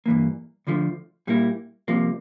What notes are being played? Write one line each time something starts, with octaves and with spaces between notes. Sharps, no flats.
G2 E3 A#3
D2 D3 F3 A3
A#2 G3 A#3 E4
C2 C3 F3 A#3